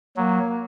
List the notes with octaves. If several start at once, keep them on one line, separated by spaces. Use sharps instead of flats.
F#3 A#3